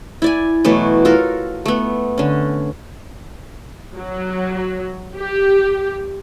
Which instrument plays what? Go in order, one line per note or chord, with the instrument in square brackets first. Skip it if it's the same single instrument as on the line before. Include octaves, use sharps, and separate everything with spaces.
[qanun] E4 D5 G#5
B2 E3 F#3 A3
F4 F#4 A4 A#4
A3 B3
D3 C#4
[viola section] F#3
G4